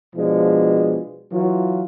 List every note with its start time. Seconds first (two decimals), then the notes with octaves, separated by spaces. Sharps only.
0.16 B2 F3 G#3 D4
1.33 E3 F#3 F4